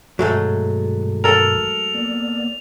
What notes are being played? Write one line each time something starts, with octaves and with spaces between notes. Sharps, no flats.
G2 B2 D#3 F#3 G#3 A3
A4 A#4 F7
A#3 B3 D5